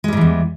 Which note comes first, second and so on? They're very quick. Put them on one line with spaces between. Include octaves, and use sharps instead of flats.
G#3 G3 G#2 E3 E2